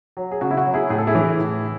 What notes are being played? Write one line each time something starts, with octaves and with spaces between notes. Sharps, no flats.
F#3
G#4
C#3 F#4
E4
F#4
F#3
E4 G#4
A2 G#4
A4
E4 G#4
E3
A2